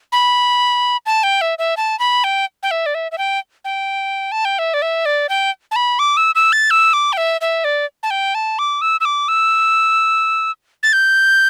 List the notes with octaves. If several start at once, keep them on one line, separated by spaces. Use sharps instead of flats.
B5
A5
G5
E5
E5
A5
B5
G5
G5
E5
D5
E5
E5
G5
G5
A5
G5
E5
D5
E5
D5
G5
A5
B5
D6
E6
E6
A6
E6
D6
G5
E5
E5
D5
A5
G5
A5
D6
E6
E6
D6
E6
A6
G6